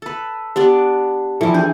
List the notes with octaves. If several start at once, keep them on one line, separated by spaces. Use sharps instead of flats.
A4 B4
B3 D4 G4 D5
E3 F3 G3 E4 A4
D4 G#4